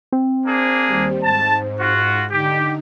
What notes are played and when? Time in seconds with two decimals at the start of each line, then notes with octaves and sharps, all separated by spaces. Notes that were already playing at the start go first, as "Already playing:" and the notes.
0.12 C4
0.45 A#3 D4 G#4
0.86 D#2 G3
1.23 G#2 A5
1.79 F4 F#4
2.31 D3 D#4 G4